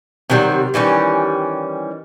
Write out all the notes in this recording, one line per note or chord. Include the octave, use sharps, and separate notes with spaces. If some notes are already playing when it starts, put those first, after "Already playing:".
C3 D#3 F#3 G3
D#3 E3 G3 C#4